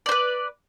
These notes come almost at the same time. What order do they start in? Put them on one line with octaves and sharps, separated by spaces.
D5 C5 B4